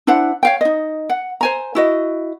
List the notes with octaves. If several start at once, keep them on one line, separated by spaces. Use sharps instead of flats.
D4 E4 C5 F#5
C#5 F5 G5
D#4 D#5
F#5
C5 G#5 A#5
E4 F#4 D#5